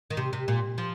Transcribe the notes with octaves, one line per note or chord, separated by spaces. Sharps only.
D#3
C3
C3
A#2
F3